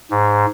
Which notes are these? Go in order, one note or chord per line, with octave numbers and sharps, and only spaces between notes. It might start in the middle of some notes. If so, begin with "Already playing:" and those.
G#2